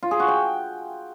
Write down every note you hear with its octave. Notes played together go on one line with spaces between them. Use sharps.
F4
G#4
F#4
G5